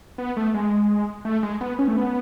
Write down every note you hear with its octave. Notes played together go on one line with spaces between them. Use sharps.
B3
A3
G#3
A3
G#3
B3
C#4
A3
B3